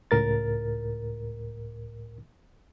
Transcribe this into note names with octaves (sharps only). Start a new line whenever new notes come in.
C#2 A2 A#4 A6